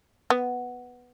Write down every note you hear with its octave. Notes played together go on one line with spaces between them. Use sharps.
B3